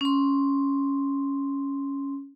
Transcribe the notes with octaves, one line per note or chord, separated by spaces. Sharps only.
C#4 C6